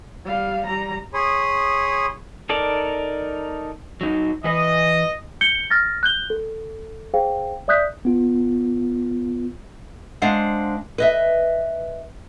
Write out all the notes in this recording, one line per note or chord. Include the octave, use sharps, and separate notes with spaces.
G3 F5
G3 A#5
G#4 C#5 B5 C6 D#6
D#4 A4 A#4 D5
F#3 D#4
E3 B4 D#5
G6 C#7 G7
F6 A6 A#6
F#6 G6 G7
A4
G#4 C5 F5 G5
D5 E5 D#6 F#6 G6 B6
B3 F4
G#3 D4 C5 F5 F#5
B4 D#5 E5